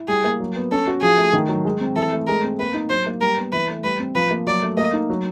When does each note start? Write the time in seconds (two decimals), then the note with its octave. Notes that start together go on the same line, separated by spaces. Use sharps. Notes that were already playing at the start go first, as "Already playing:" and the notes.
Already playing: E4
0.08 G3 G#4
0.24 A#3
0.40 F#3
0.56 B3
0.71 C#4 A4
0.87 F#4
1.02 F3 G#4
1.18 A3
1.33 D#3
1.49 F#3
1.65 G#3
1.81 C4
1.96 E3 A4
2.13 A3
2.27 G#3 A#4
2.44 C4
2.59 A#3 B4
2.74 D#4
2.90 F#3 C5
3.06 A#3
3.21 G3 A#4
3.38 B3
3.52 E3 B4
3.69 A3
3.84 G3 B4
4.00 C4
4.15 F3 B4
4.31 A#3
4.47 F#3 D5
4.63 A3
4.77 A#3 D#5
4.93 D#4
5.10 F#3